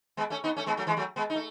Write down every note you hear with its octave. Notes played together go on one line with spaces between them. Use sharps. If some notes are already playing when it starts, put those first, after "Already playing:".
G#3 B3
A3 C#4
B3 D#4
A3 C#4
G#3 B3
F#3 A3
E3 G#3
F#3 A3
G#3 B3
D#4
A3